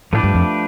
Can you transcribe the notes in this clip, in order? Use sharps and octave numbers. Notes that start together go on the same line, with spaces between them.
A2 F3 A3 D4 G4 B4
G2
F2